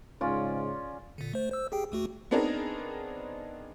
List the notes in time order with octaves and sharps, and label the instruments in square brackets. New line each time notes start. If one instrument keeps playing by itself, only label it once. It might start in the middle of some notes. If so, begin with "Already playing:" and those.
[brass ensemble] G#2 C#3 [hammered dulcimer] C#4 F4 D5
[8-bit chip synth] A#2 D3
A3 C5
C5 E6
G4 G#4 G5
D#2 A3 F#4
[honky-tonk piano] B3 C4 D4 D#4 G#4 A#4